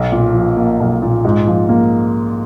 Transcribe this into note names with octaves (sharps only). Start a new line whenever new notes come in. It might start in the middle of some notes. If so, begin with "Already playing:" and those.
Already playing: B1
A#2
F3
A#3
B1
A#2
G#2
F3
A#3